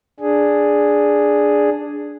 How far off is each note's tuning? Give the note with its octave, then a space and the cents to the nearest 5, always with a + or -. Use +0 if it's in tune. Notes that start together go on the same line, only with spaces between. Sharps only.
D4 +0 G#4 +0